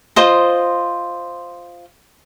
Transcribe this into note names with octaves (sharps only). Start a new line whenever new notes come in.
F4 C5 D#5